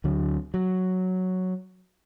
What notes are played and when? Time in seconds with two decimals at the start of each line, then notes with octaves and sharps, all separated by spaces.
0.04 D2 D3 F#3
0.54 F#3